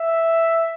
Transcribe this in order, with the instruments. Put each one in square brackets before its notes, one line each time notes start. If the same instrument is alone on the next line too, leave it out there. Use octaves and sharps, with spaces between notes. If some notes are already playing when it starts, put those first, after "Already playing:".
Already playing: [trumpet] E5